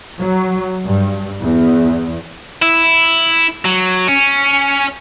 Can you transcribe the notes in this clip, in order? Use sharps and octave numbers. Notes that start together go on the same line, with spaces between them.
F#3
G2
E2
E4
F#3
C#4